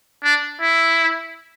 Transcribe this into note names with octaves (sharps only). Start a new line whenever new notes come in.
D4
E4